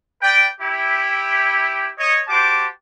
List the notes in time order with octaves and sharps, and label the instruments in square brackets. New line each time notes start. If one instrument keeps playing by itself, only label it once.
[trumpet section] B4 D5 G5
E4 G4
C#5 D#5
F#4 G4 C5 A5 D6